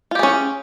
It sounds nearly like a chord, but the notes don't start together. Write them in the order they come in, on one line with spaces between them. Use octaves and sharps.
F4 G4 G#4 C#4